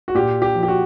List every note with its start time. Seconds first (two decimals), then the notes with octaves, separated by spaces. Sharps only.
0.08 F#4
0.14 A#2 G4
0.42 G4
0.55 F3
0.63 G4
0.68 F#4